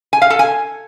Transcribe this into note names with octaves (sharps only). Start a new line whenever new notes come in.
G#5
F5
A4
G#5